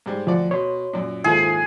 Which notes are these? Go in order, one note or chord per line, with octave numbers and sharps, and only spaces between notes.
G#2 G3 C5
D2 F3 D5 F#5
B2 C#5 C6
F#2 A#2
D#2 G#2 E4 F4 G#4 A4 C5